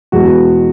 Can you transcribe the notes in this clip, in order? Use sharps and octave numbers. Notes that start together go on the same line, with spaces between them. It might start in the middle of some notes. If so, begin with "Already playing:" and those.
E2 B2 G#3 B3 F#4